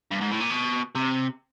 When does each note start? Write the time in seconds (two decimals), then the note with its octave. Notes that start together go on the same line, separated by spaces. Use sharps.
0.11 G2
0.21 G#2
0.31 A2
0.41 A#2
0.50 B2
0.95 C3